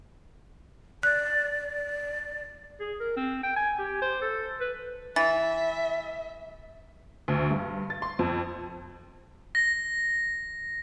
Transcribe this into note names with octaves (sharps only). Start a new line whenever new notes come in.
D5 F#6
G#4
A#4
C4
G5
G#5
G4
C5
A4
B4
E3 E5 A6
D2
G2
A6
C6
F2
A#6